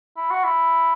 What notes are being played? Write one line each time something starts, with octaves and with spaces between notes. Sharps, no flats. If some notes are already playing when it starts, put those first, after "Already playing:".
E4
F#4
E4